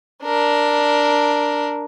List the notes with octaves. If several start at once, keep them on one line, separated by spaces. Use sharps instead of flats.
D4 A#4